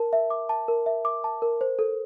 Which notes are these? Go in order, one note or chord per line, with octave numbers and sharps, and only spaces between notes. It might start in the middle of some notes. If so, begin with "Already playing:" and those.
Already playing: A#4 A5
E5
D6
A5
A#4
E5
D6
A5
A#4
C5
A4